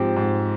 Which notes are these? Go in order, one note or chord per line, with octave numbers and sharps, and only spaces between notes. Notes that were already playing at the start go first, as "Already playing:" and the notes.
Already playing: G#2 F3 C4 G4
G#2